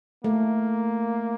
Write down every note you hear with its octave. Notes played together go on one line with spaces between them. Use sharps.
A3 A#3